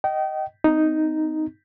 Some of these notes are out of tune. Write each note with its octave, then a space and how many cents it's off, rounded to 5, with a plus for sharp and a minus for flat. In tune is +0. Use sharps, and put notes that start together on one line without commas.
D#5 +0 G5 -30
C4 -40 D#4 +0